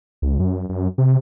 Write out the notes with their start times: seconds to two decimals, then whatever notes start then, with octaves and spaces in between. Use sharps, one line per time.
0.22 C#2
0.39 F#2
0.69 F#2
0.98 C3